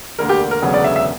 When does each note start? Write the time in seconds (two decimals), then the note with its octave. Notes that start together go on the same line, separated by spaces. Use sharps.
0.19 E1 D2 D3 A#3 A#4
0.29 G4
0.51 A#4
0.62 E1 D2 C#3 F#3 B3
0.74 D5
0.84 E5
0.96 E5